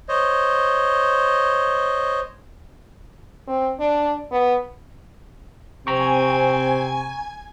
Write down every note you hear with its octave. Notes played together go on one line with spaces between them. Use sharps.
C5 C#5 D#5
C4
D4
B3
C3 C4 G#5 A#5 C#6 G#6